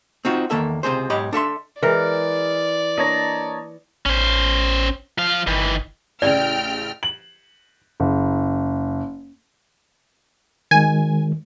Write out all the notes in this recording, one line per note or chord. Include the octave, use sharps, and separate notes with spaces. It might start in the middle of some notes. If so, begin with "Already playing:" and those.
C4 D#4 F4 F#4
E2 D#3 A#3 A4 E5
C#2 C3 C4 G#4 C5
B1 G#2 G4 C#5 D#5 B5
D4 A4 E5 C6
E3 G#3 G#4 A#4 D5
A#3 D4 C#5 D#5 A5 A#5
A1 C#4 C5
F3 F5
G1 D#3 E3
A1 C#3 D5 G5 F6
F#7
F#1
D#3 G#3 G#5